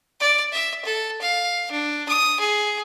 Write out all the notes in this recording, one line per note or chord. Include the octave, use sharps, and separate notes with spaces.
D5
E5
A4
F5
D4
D#6
G#4